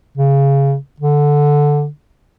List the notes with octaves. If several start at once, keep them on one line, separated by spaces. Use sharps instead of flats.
C#3
D3